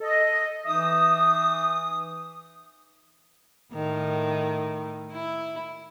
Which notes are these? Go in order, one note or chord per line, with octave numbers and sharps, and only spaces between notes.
A4 D#5
E3 D#4 E5 D#6
A2 D#3
E4